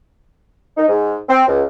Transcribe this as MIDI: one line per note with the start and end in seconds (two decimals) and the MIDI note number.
0.77 0.84 63
0.88 1.16 44
1.29 1.43 60
1.48 1.62 37